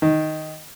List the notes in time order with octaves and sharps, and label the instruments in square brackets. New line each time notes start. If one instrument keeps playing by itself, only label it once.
[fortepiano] D#3